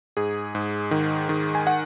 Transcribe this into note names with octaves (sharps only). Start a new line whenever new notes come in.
G#2 G#4
G#2
D#3
D#3
G#5
F#5